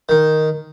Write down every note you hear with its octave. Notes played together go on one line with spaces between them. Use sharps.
D#3